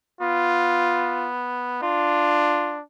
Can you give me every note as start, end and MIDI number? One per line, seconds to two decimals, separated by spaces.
0.21 1.81 59
0.21 1.29 65
1.82 2.82 62
1.82 2.75 65